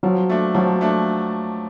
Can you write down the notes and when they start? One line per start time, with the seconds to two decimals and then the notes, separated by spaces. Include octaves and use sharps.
0.03 F3 F#3
0.29 A3 D4
0.55 F3 F#3
0.81 A3 D4